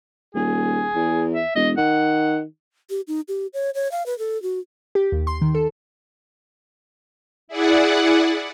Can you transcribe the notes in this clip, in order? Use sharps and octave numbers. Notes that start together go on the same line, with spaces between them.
D#1 G#4
E2
E5
E1 D#5
D#3 F#5
G4
D#4
G4
C#5
C#5
F5
B4
A4
F#4
G4
D#2
C6
D#3
A4
E4 G#4 D5 F#5